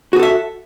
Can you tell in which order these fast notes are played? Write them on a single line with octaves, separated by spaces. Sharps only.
F#4 G#4 A4 E5